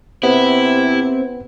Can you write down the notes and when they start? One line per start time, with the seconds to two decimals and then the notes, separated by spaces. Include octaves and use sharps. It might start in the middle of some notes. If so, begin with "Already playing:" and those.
0.23 C3 B3 C4 E4